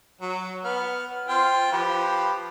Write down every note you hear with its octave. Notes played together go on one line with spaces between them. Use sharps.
F#3
B3 F6
C4 F4 G5
F3 G4 B4